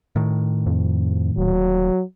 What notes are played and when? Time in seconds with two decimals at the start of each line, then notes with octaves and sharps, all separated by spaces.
0.16 A2 D#3
0.66 F2
1.37 D#1 F#3